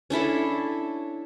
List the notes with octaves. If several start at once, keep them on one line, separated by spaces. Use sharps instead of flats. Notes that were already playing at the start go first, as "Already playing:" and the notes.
C#4 D4 E4 A4